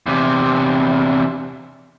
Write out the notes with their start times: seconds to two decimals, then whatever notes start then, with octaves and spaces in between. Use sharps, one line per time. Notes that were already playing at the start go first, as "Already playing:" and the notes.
0.06 E2 C3